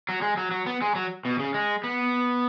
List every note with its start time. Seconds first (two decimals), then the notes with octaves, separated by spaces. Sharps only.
0.09 F#3
0.22 G#3
0.37 F#3
0.51 F#3
0.66 B3
0.82 G#3
0.95 F#3
1.25 B2
1.39 C#3
1.54 G#3
1.84 B3